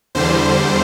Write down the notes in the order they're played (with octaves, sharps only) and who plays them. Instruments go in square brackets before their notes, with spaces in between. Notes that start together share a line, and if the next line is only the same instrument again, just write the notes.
[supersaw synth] E2 D3 G3 C5